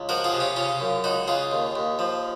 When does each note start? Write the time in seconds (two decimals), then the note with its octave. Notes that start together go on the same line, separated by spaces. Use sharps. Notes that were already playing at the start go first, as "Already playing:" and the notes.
Already playing: C#2
0.09 F3 F#4 A#4
0.24 F4 G#4
0.32 C3
0.40 C#4 F4
0.56 C#3 C#4 F4
0.80 F#2
1.04 C#2 D#4 F#4
1.28 C#2 F4 G#4
1.51 D#2
1.75 D#2
1.99 F3